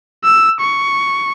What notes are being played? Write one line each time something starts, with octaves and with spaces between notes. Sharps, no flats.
E6
C#6